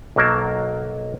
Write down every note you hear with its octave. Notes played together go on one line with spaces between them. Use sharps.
B1 F#3 A#3 A#4 A5